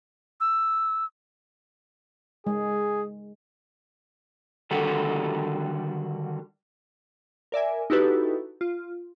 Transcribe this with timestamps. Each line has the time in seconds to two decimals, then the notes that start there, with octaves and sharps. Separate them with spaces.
0.41 E6
2.47 G#3 G#4
4.71 D3 D#3 G3 F#4 G4 A4
7.52 A#4 D5 E5 G#5
7.90 D#4 E4 F#4 G4 A4 B4
8.61 F4